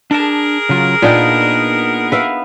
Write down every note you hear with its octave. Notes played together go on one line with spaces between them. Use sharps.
D4 G#4 A#4 A5
C#3 F#3 F4
A#2 B3 D4 D#4 G5
B4 E5 F5